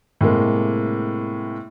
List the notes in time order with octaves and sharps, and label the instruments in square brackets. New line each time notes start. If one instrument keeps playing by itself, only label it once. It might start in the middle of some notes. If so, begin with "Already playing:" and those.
[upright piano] A2 C3 G#3 A#3